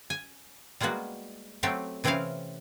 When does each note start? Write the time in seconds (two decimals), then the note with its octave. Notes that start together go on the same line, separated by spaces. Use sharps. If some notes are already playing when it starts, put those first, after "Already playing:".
0.10 G#5
0.80 G3 G#3 A#3 B3 F#4
1.63 F#3 A3 C4 G4 E5
2.04 C3 E3 C4 C#4 E4 F5